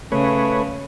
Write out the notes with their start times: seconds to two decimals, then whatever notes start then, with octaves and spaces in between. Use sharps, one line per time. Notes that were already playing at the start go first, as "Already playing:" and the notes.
0.12 C#3 A3 B4 C#5